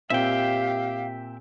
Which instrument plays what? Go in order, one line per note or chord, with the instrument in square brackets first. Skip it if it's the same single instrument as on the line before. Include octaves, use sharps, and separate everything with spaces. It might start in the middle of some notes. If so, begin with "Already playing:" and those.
[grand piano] A#2 C4 [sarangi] G4 [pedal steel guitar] E5 G5 [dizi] F5